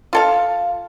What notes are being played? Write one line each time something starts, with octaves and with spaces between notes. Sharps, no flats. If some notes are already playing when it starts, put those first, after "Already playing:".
F4 A4 F5